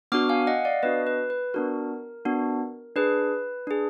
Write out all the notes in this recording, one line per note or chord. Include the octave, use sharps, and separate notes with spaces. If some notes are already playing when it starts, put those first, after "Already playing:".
B3 D4 F#4 D6 F6
F5 G#5
F5
D#5 F#5
D5 F5
B3 D4 F#4 B4 D#5
B4
B4
B3 D4 F#4 A#4
B3 D4 F#4
D4 G#4 B4
D4 G#4